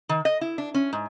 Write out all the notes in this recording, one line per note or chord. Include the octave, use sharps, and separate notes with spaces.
D#3
D#5
E4
D4
C#4
G#2